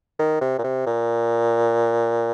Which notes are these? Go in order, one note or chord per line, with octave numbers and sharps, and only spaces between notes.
D#3
C3
A#2
C3
A#2